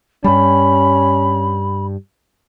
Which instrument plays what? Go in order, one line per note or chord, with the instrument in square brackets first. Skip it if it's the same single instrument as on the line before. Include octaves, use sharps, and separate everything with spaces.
[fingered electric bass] G2 G3 [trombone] C#4 [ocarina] B5